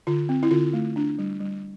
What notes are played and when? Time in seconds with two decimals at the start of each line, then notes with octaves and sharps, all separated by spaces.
0.07 D3 F4
0.29 C4
0.43 E4
0.51 D3 F4
0.73 A3
0.96 D4
1.19 G3
1.41 G3